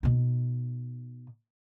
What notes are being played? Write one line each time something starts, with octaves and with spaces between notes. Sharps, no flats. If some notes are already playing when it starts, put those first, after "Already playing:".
B2 D#4